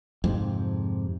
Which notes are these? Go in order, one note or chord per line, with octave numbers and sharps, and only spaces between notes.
F2 G#2 C3